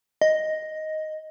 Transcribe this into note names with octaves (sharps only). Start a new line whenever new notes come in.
D#5